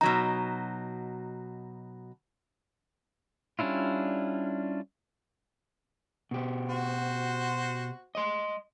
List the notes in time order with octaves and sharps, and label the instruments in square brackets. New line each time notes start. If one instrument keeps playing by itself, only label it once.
[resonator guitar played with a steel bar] B2 F#3 D#4 [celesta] A#5
[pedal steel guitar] G3 C#4 D4 E4 F4
[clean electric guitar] B2 G4
[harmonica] F#4 C5
[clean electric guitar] D#5 C6